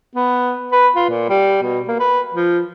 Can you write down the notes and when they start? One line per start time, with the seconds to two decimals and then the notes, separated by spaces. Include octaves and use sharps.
0.16 B3
0.72 B4
0.96 F4
1.10 A#2
1.29 G3
1.63 B2
1.88 A#3
2.00 B4
2.34 F3